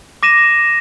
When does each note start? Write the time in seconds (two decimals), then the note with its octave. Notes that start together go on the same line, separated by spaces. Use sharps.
0.23 D6 A#6 D#7 E7